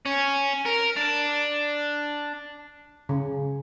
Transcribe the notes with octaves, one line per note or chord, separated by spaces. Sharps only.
C#4
A#4
D4
C#3